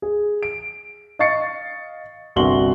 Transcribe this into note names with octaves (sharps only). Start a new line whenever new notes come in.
G#4
D7
D#5 F5 C#6 A6 C7 C#7
G1 C2 F#4 C6 F#7 G7